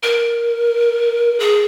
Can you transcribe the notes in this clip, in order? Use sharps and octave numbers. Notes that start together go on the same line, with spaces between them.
A#4
G#4